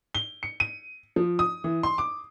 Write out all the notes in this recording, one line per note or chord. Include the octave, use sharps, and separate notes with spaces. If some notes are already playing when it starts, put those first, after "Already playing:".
G7
C#7
D#7
F3
D#6
E3
C6
D6